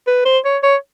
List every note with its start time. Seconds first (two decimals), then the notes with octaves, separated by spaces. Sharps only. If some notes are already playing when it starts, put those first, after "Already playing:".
0.07 B4
0.25 C5
0.44 C#5
0.63 C#5